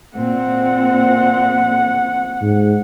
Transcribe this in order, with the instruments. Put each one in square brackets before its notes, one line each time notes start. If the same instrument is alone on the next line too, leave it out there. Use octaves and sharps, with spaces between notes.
[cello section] A#2 C4 [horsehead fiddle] F#5
[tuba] G#2